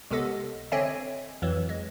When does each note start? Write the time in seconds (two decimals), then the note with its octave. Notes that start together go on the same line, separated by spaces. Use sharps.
0.11 C#2 C3 B3 A4 D#5
0.72 D3 C4 C#5 D#5 E5 G#5
1.42 F2 E3 F#3
1.69 G#3